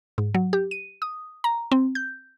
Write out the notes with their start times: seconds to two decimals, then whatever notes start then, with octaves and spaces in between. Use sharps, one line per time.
0.18 G#2
0.34 F#3
0.53 G4
0.71 D#7
1.02 D#6
1.44 A#5
1.72 C4
1.95 G6